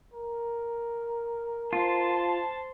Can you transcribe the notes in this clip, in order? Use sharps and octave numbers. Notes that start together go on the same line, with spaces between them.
A#4
F4 C5 A5